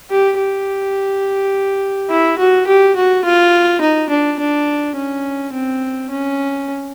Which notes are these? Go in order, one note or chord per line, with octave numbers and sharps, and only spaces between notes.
G4
G4
E4
F#4
G4
F#4
F4
D#4
D4
D4
C#4
C4
C#4